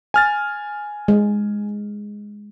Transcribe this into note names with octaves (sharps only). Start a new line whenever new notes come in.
G#5 F6 A6
G#3